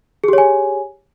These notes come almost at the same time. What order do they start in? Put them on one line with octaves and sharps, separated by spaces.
G#4 G4 C#5 G#5